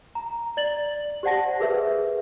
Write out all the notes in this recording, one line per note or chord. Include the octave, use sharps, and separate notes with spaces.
A#5
D5 A6 F#7
G4 C5 D5 F#5 A5 A#6
G4 G#4 A#4 B4 E5